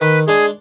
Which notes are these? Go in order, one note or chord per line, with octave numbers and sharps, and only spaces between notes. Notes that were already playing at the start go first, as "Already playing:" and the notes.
D#3 B4
G#3 D4 G#4